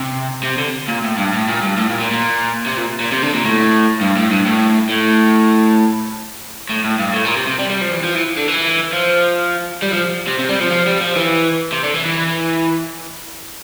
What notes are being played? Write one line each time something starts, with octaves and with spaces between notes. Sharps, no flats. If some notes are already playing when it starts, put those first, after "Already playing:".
Already playing: C3
C3
D3
A#2
A2
G2
A2
A#2
G2
A2
A#2
A#2
A#2
C3
A#2
A#2
C3
D3
A#2
A2
G2
A2
G2
A2
A2
A2
A2
G2
A2
A#2
C3
C3
G3
G3
F3
E3
F3
E3
D3
E3
F3
G3
F3
C3
C3
G3
F3
F3
G3
F3
E3
C3
D3
E3
E3